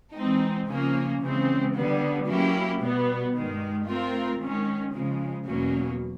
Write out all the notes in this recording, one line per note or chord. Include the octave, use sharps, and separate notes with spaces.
E3 G#3 C4 D#4
C#3 F3 A#3 C#4
C#3 E3 G#3 C4
D3 G3 B3
F#3 A#3 C#4 E4 G4
B2 G3 B3
G2 D#3 G#3
A3 C4 F4 A#4
D#3 G#3 C#4
C#3 F3 G#3
E2 B2 F#3 A#3 C#4